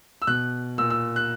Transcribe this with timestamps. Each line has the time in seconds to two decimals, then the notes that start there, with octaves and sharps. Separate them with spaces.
0.22 E6
0.27 B2 F#6
0.78 A#2 E6
0.90 E6
1.16 F#6